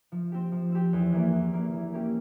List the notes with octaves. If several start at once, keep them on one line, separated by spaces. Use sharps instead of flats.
F3
C4 G4
F3
C4 G4
E2
E3 A#3
E2
E3 A#3
E3
A#3 C#4 G4